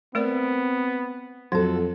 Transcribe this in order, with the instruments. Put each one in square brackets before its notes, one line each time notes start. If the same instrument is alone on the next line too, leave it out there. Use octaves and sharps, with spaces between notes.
[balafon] A3 A#4 D5 [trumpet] B3 [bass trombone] C4
[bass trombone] F2 [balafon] F#3 [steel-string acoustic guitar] F#4 A4